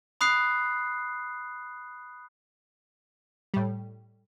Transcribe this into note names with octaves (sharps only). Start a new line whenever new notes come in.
B5 D#6 F#6 C7
A2 G3